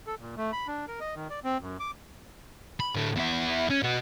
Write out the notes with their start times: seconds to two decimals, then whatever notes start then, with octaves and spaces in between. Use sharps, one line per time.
0.07 A4
0.20 A#2
0.37 A3
0.53 B5
0.67 D4
0.88 A#4
1.00 D#5
1.15 D#3
1.30 D5
1.44 C4
1.60 F#2
1.80 D6
2.80 B5
2.95 A2 D3
3.16 E2 E5
3.70 C#4
3.83 B2 B3